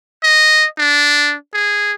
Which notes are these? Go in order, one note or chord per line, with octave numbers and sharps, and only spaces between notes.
D#5
D4
G#4